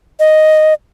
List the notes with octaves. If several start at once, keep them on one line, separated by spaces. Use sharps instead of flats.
D#5